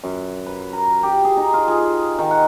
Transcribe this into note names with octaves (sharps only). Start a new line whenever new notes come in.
F#2
B4
A#4
G4
G#4
D#4
F4
G#4
D#3
F#5